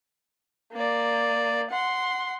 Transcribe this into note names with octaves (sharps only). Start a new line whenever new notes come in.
A#3 D5
F#5 C6